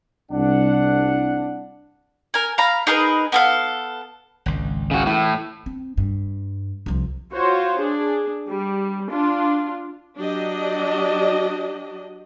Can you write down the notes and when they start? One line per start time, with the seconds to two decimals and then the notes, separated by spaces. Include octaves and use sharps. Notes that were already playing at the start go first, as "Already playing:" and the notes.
0.31 C2 D4 F#5
2.34 A#4 G#5
2.58 F5 A#5 B5
2.87 D#4 G#4 A#4 B4
3.32 B3 A4 F5
4.46 G#1 C#2
4.91 C#3 F#4
5.07 A2 E3
5.66 C4
5.97 G2
6.86 C2 F3
7.32 F4 F#4 C5 C#5
7.78 D4 G#4
8.47 G3
9.10 D4 F4
10.18 F#3 D4 G4 D#5